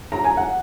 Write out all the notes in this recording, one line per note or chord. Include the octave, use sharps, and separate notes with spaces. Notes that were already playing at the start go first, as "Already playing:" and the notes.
A#5
G#5
F#5